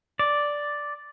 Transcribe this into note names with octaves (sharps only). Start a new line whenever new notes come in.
D5